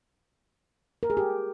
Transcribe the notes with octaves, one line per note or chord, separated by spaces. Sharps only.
A#4
G#4
G4